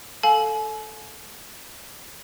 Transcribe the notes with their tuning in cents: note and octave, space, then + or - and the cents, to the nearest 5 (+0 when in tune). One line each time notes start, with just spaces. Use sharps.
A4 +0 F5 +15 G#5 +40